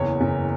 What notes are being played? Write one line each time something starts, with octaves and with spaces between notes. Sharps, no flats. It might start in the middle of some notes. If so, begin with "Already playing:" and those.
Already playing: F#1 E2 C#5
F#1